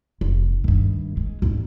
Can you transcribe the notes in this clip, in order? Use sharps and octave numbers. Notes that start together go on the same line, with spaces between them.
F1
G2 D#3
G#3
E2 G#2